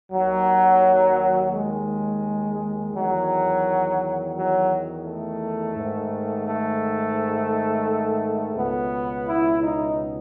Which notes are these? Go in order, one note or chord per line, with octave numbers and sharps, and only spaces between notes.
D#2 D#3 F#3
G#3
E2 D#3 F#3
F#3
A3
G#2 D#3
A3
C#2 B2 B3
E4
D#4